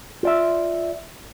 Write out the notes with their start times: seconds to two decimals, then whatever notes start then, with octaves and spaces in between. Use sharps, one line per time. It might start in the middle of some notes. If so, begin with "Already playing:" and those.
0.23 F4 D5 E5